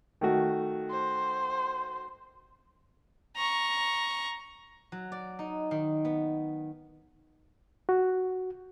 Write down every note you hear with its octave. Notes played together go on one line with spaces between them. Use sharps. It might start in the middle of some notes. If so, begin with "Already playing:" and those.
D#3 A3 F#4
C5
A#5 C#6
F#3
D5
D#4
D#3
B3
F#4